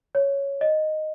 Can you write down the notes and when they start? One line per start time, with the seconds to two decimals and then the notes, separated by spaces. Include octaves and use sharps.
0.15 C#5
0.61 D#5